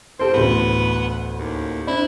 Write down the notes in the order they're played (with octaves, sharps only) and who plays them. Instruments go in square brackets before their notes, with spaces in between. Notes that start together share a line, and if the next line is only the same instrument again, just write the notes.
[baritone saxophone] C4 [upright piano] G4 A4 C5
[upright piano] A1 D2 [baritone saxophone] B3
[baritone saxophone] D#2
[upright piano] C4 D4 [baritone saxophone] E4